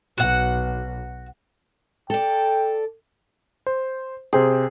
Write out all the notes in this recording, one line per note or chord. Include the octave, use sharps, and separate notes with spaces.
B1 F#4 F#5
A4 D5 G5
C5
C3 G#4 C5 G5